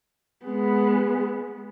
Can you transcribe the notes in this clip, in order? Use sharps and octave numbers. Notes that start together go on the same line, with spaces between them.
G#3 B3